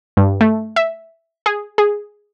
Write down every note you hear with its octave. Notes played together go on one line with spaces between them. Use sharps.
G2
A3
E5
G#4
G#4